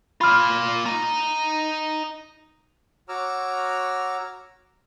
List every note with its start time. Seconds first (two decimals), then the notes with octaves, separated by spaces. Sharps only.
0.21 A#3 F4 B5 F6
0.86 D#5 A#5
3.09 F#4 C#5 A#5 D6 E6 F6